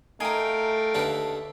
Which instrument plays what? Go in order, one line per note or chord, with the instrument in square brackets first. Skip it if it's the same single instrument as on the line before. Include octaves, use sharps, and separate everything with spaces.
[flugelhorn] A3 [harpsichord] D#4 [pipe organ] A#4 F5 G5 [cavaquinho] G#5 A#5
[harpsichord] D#2 D3 B4 [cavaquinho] A4 E5